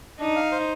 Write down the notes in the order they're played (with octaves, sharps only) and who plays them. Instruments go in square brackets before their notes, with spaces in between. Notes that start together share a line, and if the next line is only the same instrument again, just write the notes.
[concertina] D4 [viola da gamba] D#4
[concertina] F5
C5